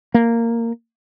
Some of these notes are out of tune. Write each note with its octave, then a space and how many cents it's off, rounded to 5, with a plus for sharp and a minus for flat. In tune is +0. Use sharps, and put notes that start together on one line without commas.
A#3 -10